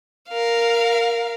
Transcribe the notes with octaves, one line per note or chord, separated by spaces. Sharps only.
A#4 F5